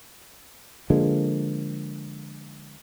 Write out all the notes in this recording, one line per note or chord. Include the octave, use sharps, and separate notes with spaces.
D3 F3 G#3 A#3